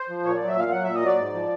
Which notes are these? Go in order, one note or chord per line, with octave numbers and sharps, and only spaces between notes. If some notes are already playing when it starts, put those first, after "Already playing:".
Already playing: C5
F3
A#2 C#5
F#3 D5
E5
A#2 F5
F#3 F#5
A#2 E5
D#5
F#3 D5
G#2
F3